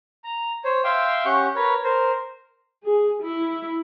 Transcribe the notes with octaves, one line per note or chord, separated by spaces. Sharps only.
A#5
C5 C#5
E5 F5 G5 C6 D6
C#4 G4 F#5 C#6 G6
A#4 B4 C#5
A#4 C5
G#4
E4